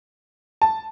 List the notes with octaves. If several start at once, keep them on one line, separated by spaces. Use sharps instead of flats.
A5